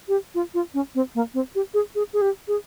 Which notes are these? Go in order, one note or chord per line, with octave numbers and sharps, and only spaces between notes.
G4
F4
F4
C#4
C4
A#3
C4
G4
G#4
G#4
G#4
G4
G#4